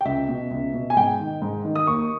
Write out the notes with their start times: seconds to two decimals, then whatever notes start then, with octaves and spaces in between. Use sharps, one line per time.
0.01 G5
0.05 C#2 E5
0.28 B2
0.51 C#2
0.74 B2
0.90 G#5
0.96 G#2 G5
1.20 D#3
1.42 G#2
1.65 D#3
1.76 D#6
1.87 D#2 C#6